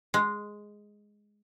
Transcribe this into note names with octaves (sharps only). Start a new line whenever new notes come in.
G#3